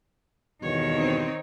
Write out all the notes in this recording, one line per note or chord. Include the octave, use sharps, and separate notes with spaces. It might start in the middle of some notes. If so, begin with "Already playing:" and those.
E2 G2 B2 D#3 C#5
C4 D#4